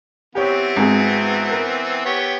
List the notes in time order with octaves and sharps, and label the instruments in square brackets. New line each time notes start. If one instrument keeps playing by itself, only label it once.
[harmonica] E3 B3 C4 [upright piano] G4 C#5
[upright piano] G#1 G#4
A#4
[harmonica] B3 G4 C#5